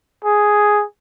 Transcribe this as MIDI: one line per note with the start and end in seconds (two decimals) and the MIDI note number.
0.25 0.84 68